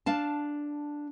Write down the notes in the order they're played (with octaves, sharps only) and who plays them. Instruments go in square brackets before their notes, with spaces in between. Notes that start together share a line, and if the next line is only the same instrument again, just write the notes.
[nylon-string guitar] D4 F5 A5